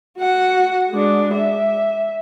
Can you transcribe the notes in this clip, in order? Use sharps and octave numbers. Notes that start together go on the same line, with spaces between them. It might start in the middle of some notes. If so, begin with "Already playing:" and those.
F#4 F#5
G#3 D4
E5